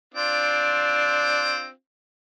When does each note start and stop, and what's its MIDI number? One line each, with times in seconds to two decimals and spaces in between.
0.14 1.70 60
0.14 1.70 62
0.14 1.70 65